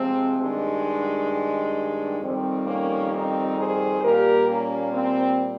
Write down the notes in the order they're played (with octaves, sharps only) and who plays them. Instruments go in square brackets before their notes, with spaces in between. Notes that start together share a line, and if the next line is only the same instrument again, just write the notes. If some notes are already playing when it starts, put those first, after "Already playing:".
Already playing: [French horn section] C3 F3 G#3 C4
G2 D#3 G#3
F2 D#3 G3 C4
A#3 C#4
C4 D#4
G#4 C5
A#2 G3 A#3 G4 A#4
A#3 C#4
C4